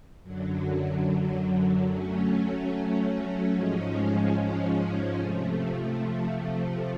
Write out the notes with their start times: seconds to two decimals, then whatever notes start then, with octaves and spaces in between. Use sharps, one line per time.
0.23 F#2 D3 F#3
1.88 F#3 A3 C#4
3.54 G#2 F3 G#3 C#4
5.18 C3 F3 A3